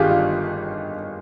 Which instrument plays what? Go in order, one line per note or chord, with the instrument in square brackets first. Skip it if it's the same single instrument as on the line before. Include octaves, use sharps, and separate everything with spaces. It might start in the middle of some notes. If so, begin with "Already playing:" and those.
Already playing: [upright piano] G1 D#3 F4 G4 G#4
F4